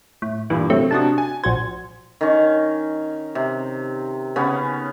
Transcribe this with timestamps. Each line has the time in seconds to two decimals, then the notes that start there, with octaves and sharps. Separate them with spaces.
0.22 A2
0.50 G2 A#2 E3
0.70 C3 F#3 A3 C4
0.91 C3 D4 F#4 D#5 A5
1.18 G#5
1.44 A#1 F#4 C5 G#6
2.21 D#3 C#4
3.35 C3
4.36 C#3 B3 C#4